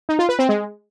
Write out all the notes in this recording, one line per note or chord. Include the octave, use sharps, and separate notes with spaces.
D#4
F4
B4
C4
G#3